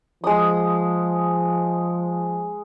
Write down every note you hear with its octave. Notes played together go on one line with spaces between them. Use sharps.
F3 G#3 D#6